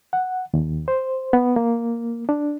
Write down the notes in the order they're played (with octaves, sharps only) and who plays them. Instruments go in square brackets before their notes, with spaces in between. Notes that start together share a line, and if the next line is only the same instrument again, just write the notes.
[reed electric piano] F#5
D#2
C5
B3
A#3
D4